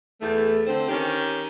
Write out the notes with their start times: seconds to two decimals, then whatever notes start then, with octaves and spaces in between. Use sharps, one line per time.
0.21 E2 A3
0.67 D3 C4 C5
0.89 D#3 C#4 G4